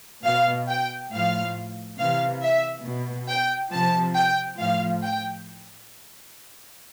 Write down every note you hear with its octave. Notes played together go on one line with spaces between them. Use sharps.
B2 F5
G5
A2 F3 F5
C3 E3 F5
E5
B2
G5
C3 F3 A5
G5
A2 F3 F5
G5